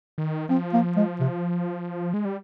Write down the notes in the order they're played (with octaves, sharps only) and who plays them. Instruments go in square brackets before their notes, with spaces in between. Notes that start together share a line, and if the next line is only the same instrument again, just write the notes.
[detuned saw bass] D#3
[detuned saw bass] F3 [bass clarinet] C4
[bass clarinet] A#3
G#3
C3
[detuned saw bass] G#3
G3